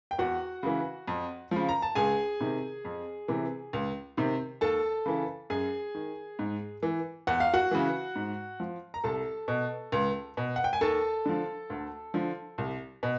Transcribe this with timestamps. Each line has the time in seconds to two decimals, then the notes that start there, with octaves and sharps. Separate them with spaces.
0.11 G5
0.19 E2 F#4 F#5
0.63 C#3 E3
1.08 F2
1.51 C#3 F3
1.69 A#5
1.82 A5
1.95 C#2 G#4 G#5
2.40 C3 D#3
2.85 F2
3.28 C3 E3
3.73 C#2
4.17 C3 D#3
4.61 D#2 A4 A5
5.06 C#3 E3
5.50 F#2 G#4 G#5
5.95 D#3
6.39 G#2
6.83 E3
7.27 E2 F#5
7.40 F5
7.54 F#4 F#5
7.71 C#3 E3
8.16 G#2
8.60 F3
8.94 A#5
9.04 C2 A4 A5
9.48 B2
9.92 C#2
10.37 B2
10.56 F#5
10.64 G5
10.73 G#5
10.81 D#2 A4 A5
11.26 D3 F3
11.70 D2
12.14 D3 F3
12.58 C2
13.03 B2